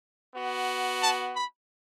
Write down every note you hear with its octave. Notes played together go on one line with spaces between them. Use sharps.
B3 F#4
A5
B5